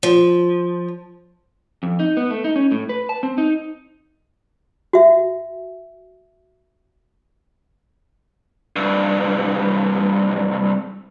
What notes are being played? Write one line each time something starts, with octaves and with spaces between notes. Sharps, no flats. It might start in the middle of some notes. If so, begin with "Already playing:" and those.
F3
F2
D#4
B3
A3
D#4
C#4
A2
B4
A5
C4
D#4
F#4 E5
C2 G2